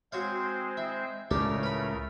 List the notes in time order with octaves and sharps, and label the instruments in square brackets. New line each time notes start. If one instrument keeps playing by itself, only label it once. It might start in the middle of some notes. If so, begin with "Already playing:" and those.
[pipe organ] G#3 C4 C5 [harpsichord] F#4 C#5 F5
[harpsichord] E4
[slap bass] C#2 A2 [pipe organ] C#3 A3 A#4 [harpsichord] D4 G4 A4
[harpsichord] B4 B5